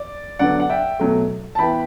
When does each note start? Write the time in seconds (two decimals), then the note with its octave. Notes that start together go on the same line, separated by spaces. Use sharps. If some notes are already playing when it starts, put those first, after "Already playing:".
Already playing: D5
0.39 D3 F#3 B3 D5 F#5
0.60 F#5
0.70 E5 G5
0.99 B2 F#3 A3
1.55 A5
1.59 E3 B3 G5 B5